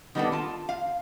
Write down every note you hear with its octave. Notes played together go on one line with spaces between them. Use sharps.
D#3 G3 A#3 B3 D4 A4
F4 A5
F5